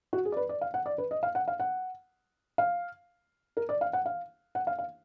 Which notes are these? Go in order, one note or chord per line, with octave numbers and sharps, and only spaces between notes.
F#4
G#4
D5
B4
D5
F5
F#5
D5
B4
D#5
F5
F#5
F5
F#5
F5
A#4
D5
F5
F#5
F5
F#5
F5
F5